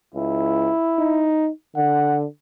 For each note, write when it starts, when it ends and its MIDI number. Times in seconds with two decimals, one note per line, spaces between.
0.15 0.70 37
0.15 1.32 64
0.99 1.50 63
1.76 2.25 50
1.76 2.19 78